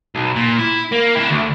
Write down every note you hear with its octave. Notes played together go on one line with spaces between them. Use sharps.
B1
A#2
E4
A#3
D4 E4
D2